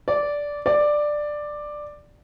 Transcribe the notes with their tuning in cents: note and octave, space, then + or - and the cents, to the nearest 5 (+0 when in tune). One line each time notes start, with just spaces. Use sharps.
D5 -10
D5 +10